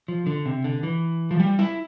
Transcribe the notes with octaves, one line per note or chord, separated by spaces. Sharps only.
F3
D3
C3
D3
E3
F3
G3
E4